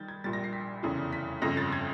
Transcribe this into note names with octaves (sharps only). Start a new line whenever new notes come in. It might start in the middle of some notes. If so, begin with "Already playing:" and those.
Already playing: D#3 G3 G6 A6
G#6
A#1 A#2 G3 A6
A#6
C7
B6
F1 E2 C#3 E3
B6
G1 F2 C#3 A#6
A6
G#6